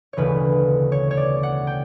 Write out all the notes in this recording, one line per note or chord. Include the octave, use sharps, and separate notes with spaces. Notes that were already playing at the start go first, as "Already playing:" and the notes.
E1 D2 C#3 E3 B4 C#5
C#5
C#5
D5
F#5
G5